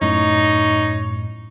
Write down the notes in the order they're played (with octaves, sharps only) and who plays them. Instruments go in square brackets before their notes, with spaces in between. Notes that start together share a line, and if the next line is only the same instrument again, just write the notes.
[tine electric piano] F#2 A2 [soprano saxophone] D#4 [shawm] C#5